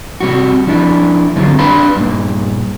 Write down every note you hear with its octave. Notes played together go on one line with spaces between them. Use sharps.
C3 G3 F#4
F3 D4 E4
G2 D3 F#3 C4 F4
D4 B4 D5 F5 B5 C6
G2 A#2